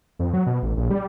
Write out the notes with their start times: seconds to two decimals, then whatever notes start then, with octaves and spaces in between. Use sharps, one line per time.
0.19 F2
0.33 F#3
0.46 B2
0.63 A1
0.77 A#1
0.90 G3